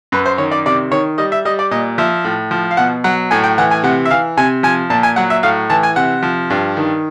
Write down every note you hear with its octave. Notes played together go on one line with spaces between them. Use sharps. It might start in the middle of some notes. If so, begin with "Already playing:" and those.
F#2 B4
C5
D#3 C#5
D5
C3 D5
D#3 C#5
G3 D#5
E5
G3 D#5
D5
A#2 D#5
F3 E5
A2
F3
F5
B2 F#5
F#3 F#5
A2 G#5
G5
E3 F#5
G#5
C3 F#5
E5
E3 F5
C3 G#5
F3 G#5
A#2 A5
G#5
F#3 F#5
E5
A2 F5
E3 A5
G#5
C3 F#5
F3
G2
D#3